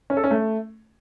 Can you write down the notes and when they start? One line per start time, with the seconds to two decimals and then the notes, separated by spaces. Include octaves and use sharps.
0.10 C#4
0.17 A4
0.24 C#4
0.31 A3